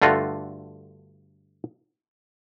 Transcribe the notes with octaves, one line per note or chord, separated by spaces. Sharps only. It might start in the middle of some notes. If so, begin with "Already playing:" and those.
G2 D3 A3 F4 F#4